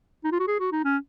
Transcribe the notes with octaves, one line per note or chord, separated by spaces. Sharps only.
D#4
F4
F#4
G#4
F#4
D#4
C#4